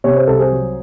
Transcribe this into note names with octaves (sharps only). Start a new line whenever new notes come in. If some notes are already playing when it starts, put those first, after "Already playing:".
C3 C#5
C5
C2 A4
G#4 C5
F#3